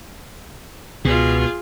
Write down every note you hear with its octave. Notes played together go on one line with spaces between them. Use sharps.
C#2 B2 F4 G#4